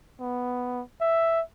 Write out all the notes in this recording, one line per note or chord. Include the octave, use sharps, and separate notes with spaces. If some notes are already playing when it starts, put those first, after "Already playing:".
B3
E5